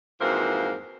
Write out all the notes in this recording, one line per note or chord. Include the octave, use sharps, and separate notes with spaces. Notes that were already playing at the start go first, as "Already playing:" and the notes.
F2 G#2 E3 A#3 F#4 C5